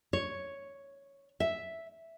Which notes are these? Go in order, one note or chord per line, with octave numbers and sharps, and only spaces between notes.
C#5
E5